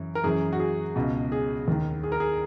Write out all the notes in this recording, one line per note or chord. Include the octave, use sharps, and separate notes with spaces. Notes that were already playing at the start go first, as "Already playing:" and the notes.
Already playing: F#2 C#3 E3
A#4
F#2 E3 G#4
F#4
G#4
C#2 B2
G#4
D#2 D#3
G#4
A#4
G#4